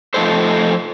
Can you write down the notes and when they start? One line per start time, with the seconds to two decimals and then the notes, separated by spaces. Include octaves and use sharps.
0.14 F3 A3 D#4 A4 C5